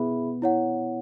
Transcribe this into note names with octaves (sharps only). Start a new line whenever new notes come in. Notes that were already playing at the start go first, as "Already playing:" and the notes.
Already playing: B3 E4 G#4 E5 B5
E4 C#5 F#5